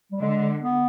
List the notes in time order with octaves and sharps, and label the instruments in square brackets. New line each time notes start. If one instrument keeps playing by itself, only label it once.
[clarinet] G3
[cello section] D3 [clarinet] G#3
[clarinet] B3